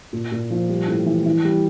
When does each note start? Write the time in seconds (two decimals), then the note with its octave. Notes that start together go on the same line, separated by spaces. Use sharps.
0.13 A#2
0.32 A#2
0.50 F3
0.69 G3
0.88 A2
1.06 E3
1.26 E3
1.45 G3